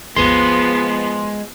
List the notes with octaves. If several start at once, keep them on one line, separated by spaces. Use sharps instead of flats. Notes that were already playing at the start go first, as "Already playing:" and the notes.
G#1 D#2 F3 G#3 B3 C6